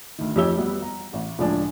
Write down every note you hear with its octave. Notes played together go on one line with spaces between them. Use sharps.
D2 D#3
F2 D#4 G4 C#5 E6 G7
F#3 G3 B3
A#5
A1
C#2 A2 F3 D4 G#5